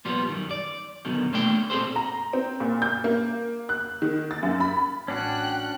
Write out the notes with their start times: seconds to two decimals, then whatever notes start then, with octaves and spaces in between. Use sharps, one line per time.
0.05 A#2 F3 G3 B3
0.29 F#2 D#3
0.51 D5
1.05 F#2 B2 D3 D#3
1.32 E2 A3 A#3 D4 G5
1.70 A#2 C4 G#4 A4 C5
1.96 A#5
2.33 C4
2.60 A#2
2.82 G6
3.04 A#3
3.69 F#6
4.02 D#3
4.31 A6
4.43 F#2
4.60 B5
5.08 A1 C#4 D4 F#4 G5 F#6